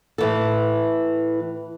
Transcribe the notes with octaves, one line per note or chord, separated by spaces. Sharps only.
A2 E3 A4